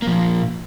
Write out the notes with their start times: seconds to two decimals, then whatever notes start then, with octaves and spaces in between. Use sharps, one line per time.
0.02 A#3
0.07 F3
0.12 A#2